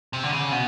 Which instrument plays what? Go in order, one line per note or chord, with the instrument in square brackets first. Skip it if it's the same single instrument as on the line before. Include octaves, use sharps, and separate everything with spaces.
[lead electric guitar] C3
D3
C#3
B2